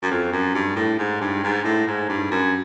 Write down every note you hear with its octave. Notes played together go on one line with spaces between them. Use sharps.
F#2
F2
F#2
G2
A2
G#2
G2
G#2
A2
G#2
G2
F#2